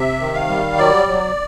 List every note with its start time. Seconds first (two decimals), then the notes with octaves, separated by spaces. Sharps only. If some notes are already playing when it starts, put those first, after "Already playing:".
Already playing: C3 E5
0.20 D#3
0.34 F5
0.49 G3
0.77 F#3 D5
1.07 F#3